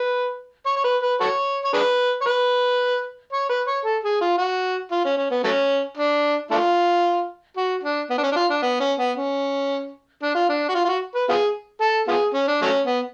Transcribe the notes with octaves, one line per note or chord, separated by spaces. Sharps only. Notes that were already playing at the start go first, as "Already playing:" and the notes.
Already playing: B4
C#5
C#5
B4
B4
F#4 A4 C#5
C#5
D4 G#4 B4
C#5
B4
C#5
B4
C#5
A4
G#4
F4
F#4
F4
C#4
C#4
B3
F#3 A3 C#4
D4
A3 D4 F4
F#4
D4
B3
D4
C#4
D4
F4
D4
B3
C#4
B3
C#4
D4
F4
D4
F#4
F4
F4
F#4
B4
B3 F4 G#4
A4
B3 F4 G#4
C#4
D4
F#3 A3 C#4
B3